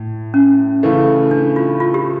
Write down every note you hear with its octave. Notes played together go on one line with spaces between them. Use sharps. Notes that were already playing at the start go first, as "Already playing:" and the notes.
Already playing: A2
C#4
C#3 E3 A3
D4
F4
F4
G4